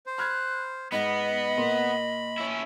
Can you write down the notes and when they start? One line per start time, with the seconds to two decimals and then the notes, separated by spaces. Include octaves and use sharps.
0.06 C5
0.18 B5 F6 F#6 G#6
0.92 G#2 B3 D#5 B5
1.57 A#2 A#4 C6
2.38 C#4 E4